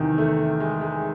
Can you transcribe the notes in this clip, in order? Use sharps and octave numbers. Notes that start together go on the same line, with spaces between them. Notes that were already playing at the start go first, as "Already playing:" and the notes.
Already playing: E2 C3 D#3
A3
G#3
G#3